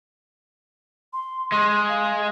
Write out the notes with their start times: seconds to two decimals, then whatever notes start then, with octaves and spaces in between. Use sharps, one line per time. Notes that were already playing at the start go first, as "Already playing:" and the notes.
1.13 C6
1.52 G#3 C6
1.89 F5